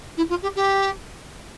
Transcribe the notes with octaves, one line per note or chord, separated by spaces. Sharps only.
E4
F4
G4
G4